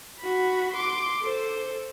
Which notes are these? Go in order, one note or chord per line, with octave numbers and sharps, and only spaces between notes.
F#4 B5
C6 D6
A4 C5